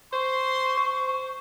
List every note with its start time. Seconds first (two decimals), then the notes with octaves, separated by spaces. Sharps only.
0.13 C5 C6 C#6
0.77 C5